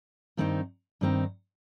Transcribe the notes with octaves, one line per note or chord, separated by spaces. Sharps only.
G2 D#3 C4 D#4
G2 D#3 C4 D#4